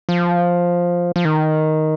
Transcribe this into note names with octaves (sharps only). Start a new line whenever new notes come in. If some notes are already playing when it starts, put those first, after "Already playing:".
F3
F3
D#3